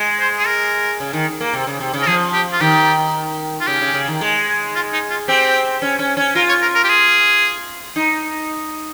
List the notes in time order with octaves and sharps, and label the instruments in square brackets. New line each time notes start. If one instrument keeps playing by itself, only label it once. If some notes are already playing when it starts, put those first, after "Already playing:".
Already playing: [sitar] G#3
[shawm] C5
G#4
A#4
[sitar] C#3
D#3
A#3
C3
C#3
C3
C#3
[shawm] A#4
[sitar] F3 [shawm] G#4
[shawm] G4
F4
[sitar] D#3 [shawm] G4
[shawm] F4
[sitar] C#3 [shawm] G4
[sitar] C#3
C#3
D#3
G#3
[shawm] F4
D#4
F4
[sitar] C4 [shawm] G4
[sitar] C#4
C#4
C#4
[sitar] F4 [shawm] A#4
[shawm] C#5
A#4
A#4
G4
G#4
[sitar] D#4